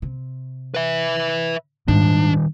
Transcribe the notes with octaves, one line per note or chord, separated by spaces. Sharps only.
C3
B4 E5
G#2 D#3 G3 D4